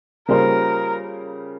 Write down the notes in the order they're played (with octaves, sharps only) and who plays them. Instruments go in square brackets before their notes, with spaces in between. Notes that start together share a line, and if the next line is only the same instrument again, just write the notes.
[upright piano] C#3 G3 A#3 F4 C5 [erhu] A#4